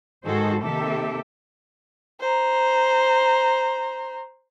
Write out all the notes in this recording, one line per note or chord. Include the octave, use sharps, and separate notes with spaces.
G#2 D#3 F#4 G#4 A4 C5
C3 D#3 A#3 G4 A4 E5
C5 A#5